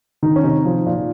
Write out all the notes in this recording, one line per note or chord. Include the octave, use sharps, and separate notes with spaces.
D#3 D#4
C#4
C3 D#4
F3
A#2